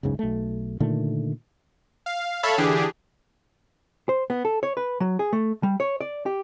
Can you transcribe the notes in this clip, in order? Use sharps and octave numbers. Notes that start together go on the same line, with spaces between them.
F#1 C#2 G#2 C#3
B1 A3
A#2 D3 D#3 A3
F5
A4 C#5 E5 F5 A5 B5
D3 E3 D4 G4 G#4
C5
B3
A4
C#5
B4
F#3
G#4
A3
G3
C#5
D5
G4